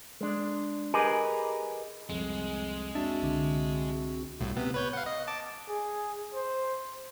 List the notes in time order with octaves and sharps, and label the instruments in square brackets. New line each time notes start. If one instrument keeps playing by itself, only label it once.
[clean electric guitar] G#3 D4
G4 G#4 A#4 B4 D#5 G#5
[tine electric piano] C2 F2 [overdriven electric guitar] G#3
[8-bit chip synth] C4 F#4 [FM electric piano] D4 [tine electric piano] E5 A5
[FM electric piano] C2 D3
[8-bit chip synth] C2 A2
C3 B3
B4 C#5 G6
F5 F#5
D#5
A5 D6
[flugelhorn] G#4
C5